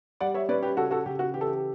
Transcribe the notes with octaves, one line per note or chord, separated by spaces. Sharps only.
G3 D5 F#5
C#5 E5
C#4 B4 D5
G4 B4
C#3 F#4 A4
F#4 A4
C#3 G4
F#4
E3 G4
A4
G4